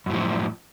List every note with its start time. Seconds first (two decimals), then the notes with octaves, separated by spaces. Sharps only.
0.06 F#2
0.10 A2
0.13 F3